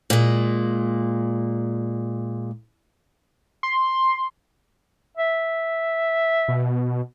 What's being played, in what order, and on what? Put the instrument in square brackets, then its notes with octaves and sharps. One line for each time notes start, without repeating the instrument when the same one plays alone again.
[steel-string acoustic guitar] A#2 G#3
[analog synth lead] C6
[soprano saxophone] E5
[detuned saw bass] B2